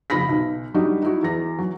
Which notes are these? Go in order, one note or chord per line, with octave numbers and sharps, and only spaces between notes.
F#1 F3 B5 A#6 B6
B1
F#3 G3 D4 D#4 F#4
D#4 E4 F#4
E2 A#6
F#3